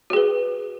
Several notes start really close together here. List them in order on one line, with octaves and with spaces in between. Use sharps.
F#4 G#4 B4